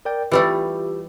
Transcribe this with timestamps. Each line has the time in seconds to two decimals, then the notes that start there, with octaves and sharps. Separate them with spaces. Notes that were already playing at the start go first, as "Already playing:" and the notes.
0.05 A#4 D5 G5
0.31 E3 G3 A3 F4 G4